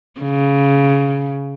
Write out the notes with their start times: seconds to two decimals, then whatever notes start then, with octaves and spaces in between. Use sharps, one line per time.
0.21 C#3